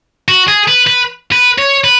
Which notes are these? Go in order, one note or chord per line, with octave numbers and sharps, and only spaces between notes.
F#4
G#4
B4
B4
B4
C#5
B4